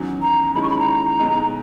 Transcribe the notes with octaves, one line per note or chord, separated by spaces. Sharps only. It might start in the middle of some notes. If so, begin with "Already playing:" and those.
Already playing: E2 D#3 F#3 C#4
A#5
D#2 D#3 G#3 C#4 E4 B5
C#6
B5
A#5
B1 B2 G#3 D#4